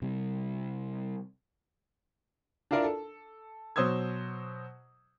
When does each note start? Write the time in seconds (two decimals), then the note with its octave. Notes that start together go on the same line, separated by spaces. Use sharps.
0.02 C3 G3
2.71 D4 E4 F4 A#4 D5
2.84 A4
3.76 B2 F#3 C5 D#6 E6 G#6